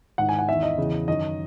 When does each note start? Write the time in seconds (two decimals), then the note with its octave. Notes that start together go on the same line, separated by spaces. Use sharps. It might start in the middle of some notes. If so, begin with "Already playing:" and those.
0.18 G#2 D#3 F#5
0.29 G#5
0.39 F#5
0.48 E2 D#3 E5
0.63 D#5
0.78 E2 C#3 E3
1.08 F#2 D#3 D#5